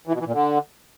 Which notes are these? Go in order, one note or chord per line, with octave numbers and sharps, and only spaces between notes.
E3
B2
E3
A#2
D3